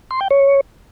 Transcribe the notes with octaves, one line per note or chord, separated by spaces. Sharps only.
C6
G5
C#5